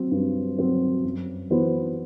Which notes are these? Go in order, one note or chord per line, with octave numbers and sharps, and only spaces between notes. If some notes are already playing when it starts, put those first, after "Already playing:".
Already playing: F#3 C4 F#4
G2
F#3 C4 F#4
F#2
E3 B3 F#4 C5